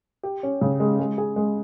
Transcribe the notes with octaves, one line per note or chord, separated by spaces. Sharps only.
G4
C#4
C#3
G#3
G#3
G#4
G#3